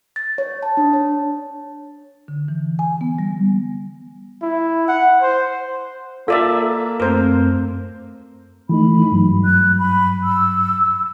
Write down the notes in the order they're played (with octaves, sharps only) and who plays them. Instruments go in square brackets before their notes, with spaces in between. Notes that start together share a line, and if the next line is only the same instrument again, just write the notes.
[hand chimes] A6
C#5
A5
D4
C#5
[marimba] D3
E3
G#5
B3
G3
[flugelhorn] E4
F#5
C5
[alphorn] A#3 [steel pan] F4 D5 E5 [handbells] A4
[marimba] F#2 A3 C4 [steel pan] A#4 C5
[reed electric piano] E3 A3 D#4 [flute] B5
[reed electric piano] G2 F#3
[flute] F#6
B5
E6